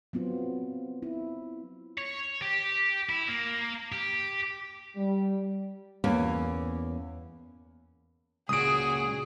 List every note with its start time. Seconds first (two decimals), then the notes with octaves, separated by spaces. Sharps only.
0.13 F#3 B3 C4 F4
1.03 E4
1.98 C#5
2.42 G4
3.09 E4
3.28 A#3
3.92 G4
4.96 G3
6.04 E2 A#3 C#4
8.49 C#2 A#2 F#4 G#4 D#6 D7